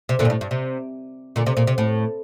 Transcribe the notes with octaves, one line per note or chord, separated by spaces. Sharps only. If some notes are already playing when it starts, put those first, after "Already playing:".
C3
A#2 D3
G2
A2
G2
C3
A#2 D3
C3
A#2
C3
A2